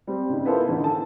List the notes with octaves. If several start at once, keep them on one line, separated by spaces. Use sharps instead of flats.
G3 C4
G#2 C#3
B3 E4 F4 A4 A#4 C5
A1 D3 D#3
A4 A5